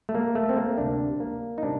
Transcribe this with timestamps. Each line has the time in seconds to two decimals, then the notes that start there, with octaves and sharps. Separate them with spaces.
0.09 A3
0.15 A#3
0.35 A3
0.49 C4
0.57 A#3
0.78 D2 C3 G3 D4
1.20 A#3
1.58 D#4
1.63 C3 G3 D4